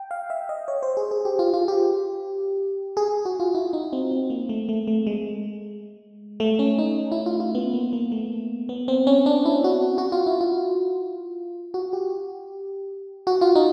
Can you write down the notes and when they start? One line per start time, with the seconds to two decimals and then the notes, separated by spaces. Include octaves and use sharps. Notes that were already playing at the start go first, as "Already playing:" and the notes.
Already playing: G5
0.11 F5
0.30 E5
0.49 D#5
0.68 C#5
0.83 C5
0.97 G#4
1.11 G#4
1.25 G4
1.39 F4
1.54 F4
1.68 G4
2.97 G#4
3.25 F#4
3.40 F4
3.55 E4
3.73 D#4
3.93 C4
4.11 C4
4.30 A#3
4.49 A3
4.69 A3
4.87 A3
5.07 G#3
6.40 A3
6.59 C#4
6.78 D#4
7.12 E4
7.26 F4
7.40 F4
7.55 B3
7.74 A#3
7.93 A#3
8.12 A3
8.69 B3
8.88 C4
9.07 C#4
9.26 D4
9.45 E4
9.64 F#4
9.98 F#4
10.12 F4
10.26 E4
10.41 F4
11.74 F#4
11.93 G4
13.27 F#4
13.41 F4
13.55 D#4